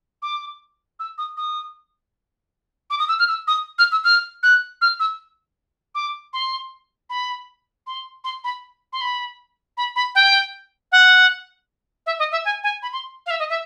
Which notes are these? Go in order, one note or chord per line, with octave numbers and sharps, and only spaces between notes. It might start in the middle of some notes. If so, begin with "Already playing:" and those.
D6
E6
D#6
D#6
D6
D#6
E6
F6
E6
D#6
F6
E6
F6
F#6
F6
E6
D6
C6
B5
C6
C6
B5
C6
B5
B5
B5
G5
F#5
E5
D#5
E5
G#5
G#5
B5
C6
F5
E5
D#5
E5